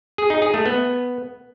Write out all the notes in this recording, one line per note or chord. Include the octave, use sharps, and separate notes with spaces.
G#4
D#4
G#4
A3
B3